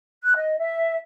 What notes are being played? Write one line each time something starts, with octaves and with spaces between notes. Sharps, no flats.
F#6
D#5
E5